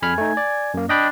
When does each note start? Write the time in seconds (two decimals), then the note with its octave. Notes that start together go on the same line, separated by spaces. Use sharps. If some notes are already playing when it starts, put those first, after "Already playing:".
0.02 F2 G#5 B5 F6
0.18 A3 D#4
0.37 D5
0.74 F#2 A#3
0.89 D4 D#5 G5 B5